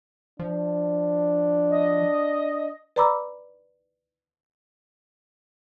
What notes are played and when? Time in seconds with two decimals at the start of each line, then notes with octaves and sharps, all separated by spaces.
0.39 F3 D4
1.70 D#5
2.96 B4 D5 A#5 B5 D6 E6